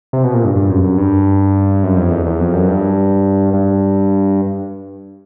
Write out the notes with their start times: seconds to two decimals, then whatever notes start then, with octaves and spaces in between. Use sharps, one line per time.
0.13 C3
0.24 B2
0.34 A#2
0.45 G2
0.56 G2
0.70 F#2
0.84 F#2
0.98 G2
1.83 F#2
1.97 F2
2.11 E2
2.26 E2
2.40 F2
2.54 F#2
2.69 G2
3.54 G2